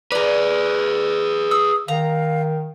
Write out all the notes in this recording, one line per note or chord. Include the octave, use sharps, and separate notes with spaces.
G#4 B4 D5 A#5
D#6 E6
D#3 F5 A#5